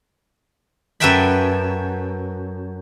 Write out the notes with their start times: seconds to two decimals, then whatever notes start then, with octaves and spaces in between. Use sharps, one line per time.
1.00 F#2 A4 B4 E5 G5 B5